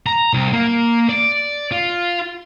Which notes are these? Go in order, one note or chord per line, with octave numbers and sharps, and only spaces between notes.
A#5
C2
A#3
D5
F4